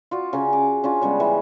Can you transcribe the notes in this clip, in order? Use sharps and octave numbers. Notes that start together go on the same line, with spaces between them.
F4 F#4 D5
C#3 C#4
D6
C#4 D4 F4
C#3 G3 G#3 B3
E3